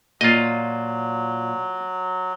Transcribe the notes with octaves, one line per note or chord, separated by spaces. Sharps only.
A#2 F#3 F4 D#5